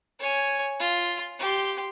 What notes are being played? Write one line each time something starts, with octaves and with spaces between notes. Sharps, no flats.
C#5 G#5
F4
G4 C6